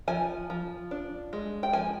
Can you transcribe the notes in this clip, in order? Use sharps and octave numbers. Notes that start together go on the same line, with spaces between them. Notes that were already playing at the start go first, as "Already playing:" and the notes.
F3 G#5
F3
D4
G#3
G5
F3 G#5